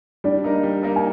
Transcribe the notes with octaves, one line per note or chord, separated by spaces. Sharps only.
G3 D4 D5
A#3 D#4 A#4 D#5
G3
A#3 D#4 A#4 D#5
G#5